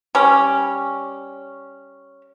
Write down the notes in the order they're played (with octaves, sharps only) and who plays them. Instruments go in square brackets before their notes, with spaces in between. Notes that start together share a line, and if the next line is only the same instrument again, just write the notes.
[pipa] G3 C#4